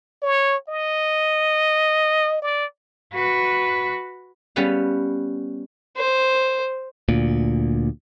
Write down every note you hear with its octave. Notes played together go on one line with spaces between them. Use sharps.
C#5
D#5
D5
F#4 B4
G3 B3 C#4 B4 F5
C5
D2 A#2